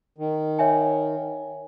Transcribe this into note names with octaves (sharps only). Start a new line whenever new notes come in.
D#3
C#5 E5 G#5